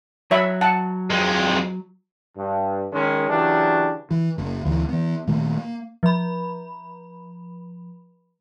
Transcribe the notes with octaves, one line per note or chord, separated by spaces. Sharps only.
F#3 C#5 E5 B5
F#5 A5
F2 G#3
G2
A#1 D#3 G#3 C#4
C#3 E3 F#3 D4 G4
E3
F#1 A#3
D2 D3 E3
E3 B3
A#2 D#3 A3 A#3
A#3
F3 B5